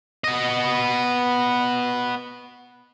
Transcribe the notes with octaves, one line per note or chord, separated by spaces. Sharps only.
B3 D#5